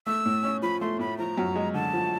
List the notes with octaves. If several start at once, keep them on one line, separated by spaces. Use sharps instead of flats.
A3 E6
A2
C#4
F3 B5
A3 C6
A2 B5
F3 A#5
F#2
G#3
D3 A5
F3